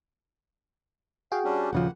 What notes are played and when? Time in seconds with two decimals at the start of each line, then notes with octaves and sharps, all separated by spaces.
1.32 F#4 G#4 F5 G5
1.44 G3 C#4 D4
1.73 D#1 A2 C#3 F3 A#3 F#5